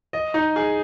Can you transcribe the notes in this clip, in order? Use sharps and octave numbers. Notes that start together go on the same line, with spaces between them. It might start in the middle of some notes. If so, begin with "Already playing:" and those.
D#5
D#4
G#4